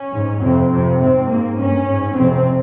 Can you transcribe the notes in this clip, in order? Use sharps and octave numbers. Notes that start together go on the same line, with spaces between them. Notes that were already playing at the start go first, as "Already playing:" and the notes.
Already playing: C#4
G#2
F2 C3 C4
F2 C3 C4
G#2 C4
G#2 A#3
G2 C#4
G#2
F2 C3 C4